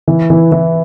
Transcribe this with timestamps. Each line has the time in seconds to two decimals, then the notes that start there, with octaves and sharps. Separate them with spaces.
0.08 E3
0.30 E3
0.52 E3